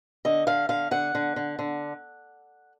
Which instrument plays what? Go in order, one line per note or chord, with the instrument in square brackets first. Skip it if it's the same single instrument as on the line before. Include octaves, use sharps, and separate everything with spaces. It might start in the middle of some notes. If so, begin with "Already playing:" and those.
[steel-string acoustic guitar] D3 D#5
D3 F5
D3 F5
D3 F#5
D3
D3
D3